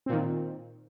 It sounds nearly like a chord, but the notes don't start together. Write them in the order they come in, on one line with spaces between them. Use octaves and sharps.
C4 A#2 D#3